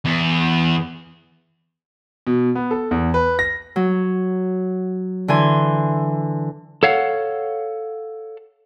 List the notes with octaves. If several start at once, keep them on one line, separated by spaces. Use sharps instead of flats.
E2
B2
B3
A4
E2
B4
A#6
F#3
D3 E3 G#5 C6
A4 C#5 F5 F#5